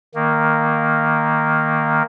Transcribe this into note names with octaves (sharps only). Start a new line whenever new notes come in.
D#3 A#3